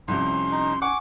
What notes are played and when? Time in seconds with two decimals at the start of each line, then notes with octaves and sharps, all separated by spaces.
0.08 C2 F2 C3 C#4 C6
0.51 D#4
0.82 F#5 G#5 C#6 D6